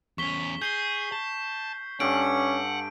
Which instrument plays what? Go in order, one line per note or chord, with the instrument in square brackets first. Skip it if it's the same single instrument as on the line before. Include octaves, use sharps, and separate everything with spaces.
[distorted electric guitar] E2 C#4 [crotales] C#6 B6 G7
[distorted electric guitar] G#4 [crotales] G6 C7 G7
[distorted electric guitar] A5
[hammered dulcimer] G2 A4 G#5 [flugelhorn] C#4 [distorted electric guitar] F#5 [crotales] D7